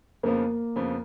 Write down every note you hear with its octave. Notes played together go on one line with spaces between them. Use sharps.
F2 C#3 F3 A#3 B3
F2 C#3 F3 B3